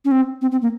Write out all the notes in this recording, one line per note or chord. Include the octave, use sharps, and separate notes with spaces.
C#4
C4
C4
C4
A#3